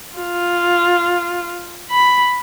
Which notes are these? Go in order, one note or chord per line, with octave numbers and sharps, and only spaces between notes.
F4
B5